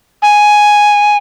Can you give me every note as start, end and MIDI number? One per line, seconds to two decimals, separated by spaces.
0.22 1.17 80